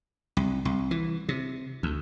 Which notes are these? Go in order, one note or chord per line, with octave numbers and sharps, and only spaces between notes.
C2
C2
E3
C3
D2